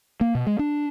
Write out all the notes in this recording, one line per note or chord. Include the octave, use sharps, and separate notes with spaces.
A#3
B2
G#3
D4